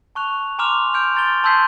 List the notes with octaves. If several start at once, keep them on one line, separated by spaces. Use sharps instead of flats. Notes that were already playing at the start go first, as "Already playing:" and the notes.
A5 C#6 F#6 F7
G#5 A#5 C6 D6 F6 F7
C6 F6 G6 D7
A#5 C6 A6 D7 G7
A5 C6 E6 G6 B6 C7